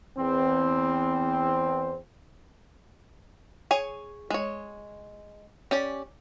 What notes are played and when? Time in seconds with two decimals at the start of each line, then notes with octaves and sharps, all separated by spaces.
0.17 E2 C4
3.71 G#4 C#5 G#5
4.30 G#3 C#5
5.71 C#4 G4 D5